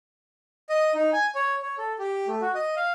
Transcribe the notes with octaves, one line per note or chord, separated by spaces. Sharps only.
D#5
D#4
G#5
C#5
C#5
A4
G4
A3
F#4
D#5
F5